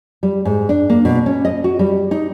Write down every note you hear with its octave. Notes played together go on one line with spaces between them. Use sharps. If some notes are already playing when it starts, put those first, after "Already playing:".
G3
G#2
D4
A#3
B2
C#4
D#5
F#4
G3
D#4